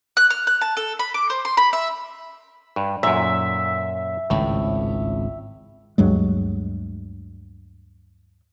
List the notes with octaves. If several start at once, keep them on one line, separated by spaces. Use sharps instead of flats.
F#6
F6
F#6
A5
A4
B5
D6
C5
C6
B5
E5
G2
F#2 A#2 E5
G#1 C#2 A2
D2 G2 F#3 G#3